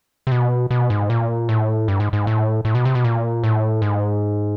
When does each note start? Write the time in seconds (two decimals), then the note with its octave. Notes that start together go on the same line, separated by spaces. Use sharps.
0.27 C3
0.32 B2
0.71 B2
0.90 G#2
1.10 A#2
1.49 A2
1.88 G2
2.00 G#2
2.13 G#2
2.27 A2
2.65 A2
2.75 B2
2.85 C3
2.95 B2
3.04 A#2
3.44 A2
3.82 G#2